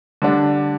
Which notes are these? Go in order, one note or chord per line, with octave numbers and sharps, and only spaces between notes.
D3 G3 D4